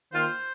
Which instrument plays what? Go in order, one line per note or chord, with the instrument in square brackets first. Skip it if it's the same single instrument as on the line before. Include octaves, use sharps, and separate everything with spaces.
[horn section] D#3 A#3 F4 [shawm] C5